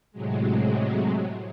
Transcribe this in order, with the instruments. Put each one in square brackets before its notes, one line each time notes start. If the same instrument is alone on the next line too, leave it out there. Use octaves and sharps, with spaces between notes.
[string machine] A2 C3 F#3 G#3